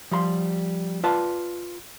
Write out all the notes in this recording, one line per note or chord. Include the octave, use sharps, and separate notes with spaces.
F3 G3 B5 C6
F4 B4 D5 A5